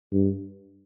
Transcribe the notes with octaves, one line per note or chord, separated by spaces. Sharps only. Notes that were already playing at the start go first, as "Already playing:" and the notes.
G2